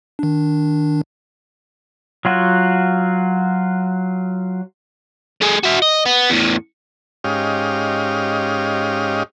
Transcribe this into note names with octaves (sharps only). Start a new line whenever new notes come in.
D#3 D4
F#3 F4 F#4
A3 G#4
F#4 E5
D#5
B3
E2 A2
G#2 C#4 G4 D#5 F5